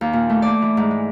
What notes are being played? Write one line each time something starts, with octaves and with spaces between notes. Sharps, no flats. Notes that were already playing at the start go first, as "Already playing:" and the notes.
D#2
A#2
A3
D5
E3
G#2
G#3